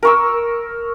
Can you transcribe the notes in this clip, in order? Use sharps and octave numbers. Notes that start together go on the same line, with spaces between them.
A#4 C#6 E6